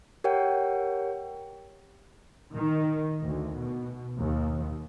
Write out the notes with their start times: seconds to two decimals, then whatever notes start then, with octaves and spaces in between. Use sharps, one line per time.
0.24 G4 A#4 C#5 F#5 G5
2.54 D#3
3.23 D2
3.56 B2
4.20 D#2